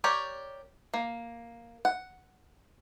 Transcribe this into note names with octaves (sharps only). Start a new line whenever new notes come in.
G4 A#4 C#5 D5
A#3
F#5